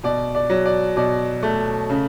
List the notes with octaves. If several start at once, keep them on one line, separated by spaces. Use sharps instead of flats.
B2 D5
D5
F#3
D5
B2 D5
A3
C#3